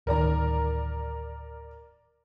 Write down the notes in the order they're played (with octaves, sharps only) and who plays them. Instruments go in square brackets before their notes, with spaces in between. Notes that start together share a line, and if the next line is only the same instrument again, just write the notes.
[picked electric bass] D1 D#3 [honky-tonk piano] A#4 D5 A#5